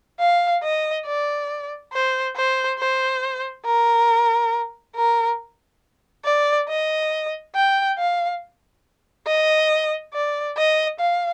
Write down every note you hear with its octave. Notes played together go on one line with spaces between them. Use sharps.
F5
D#5
D5
C5
C5
C5
A#4
A#4
D5
D#5
G5
F5
D#5
D5
D#5
F5